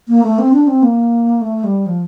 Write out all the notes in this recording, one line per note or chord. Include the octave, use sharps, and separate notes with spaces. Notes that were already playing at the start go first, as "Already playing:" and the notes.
A#3
A3
C4
D4
C4
A#3
A3
G3
F3